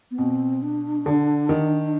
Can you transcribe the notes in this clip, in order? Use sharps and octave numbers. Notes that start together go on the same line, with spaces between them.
B3
B2 C4
D4
D3
D#3